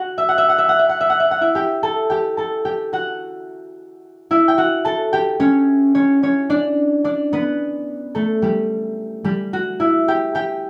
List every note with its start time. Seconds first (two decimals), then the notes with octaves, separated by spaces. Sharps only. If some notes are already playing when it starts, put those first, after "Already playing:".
Already playing: F#4 F#5
0.18 E5
0.29 F#5
0.38 E5
0.49 F#5
0.58 E5
0.69 F#5
0.79 E5
0.89 F#5
1.01 E5
1.10 F#5
1.20 E5
1.31 F#5
1.41 E4 E5
1.55 G4 G5
1.83 A4 A5
2.10 G4 G5
2.37 A4 A5
2.65 G4 G5
2.93 F#4 F#5
4.31 E4 E5
4.48 G5
4.58 F#4 F#5
4.85 A4 A5
5.13 G4 G5
5.40 C#4 C#5
5.95 C#4 C#5
6.23 C#4 C#5
6.50 D4 D5
7.04 D4 D5
7.33 B3 B4
8.15 A3 A4
8.42 G3 G4
9.24 G3 G4
9.53 F#4
9.80 E4 E5
10.08 G4 G5
10.35 G4 G5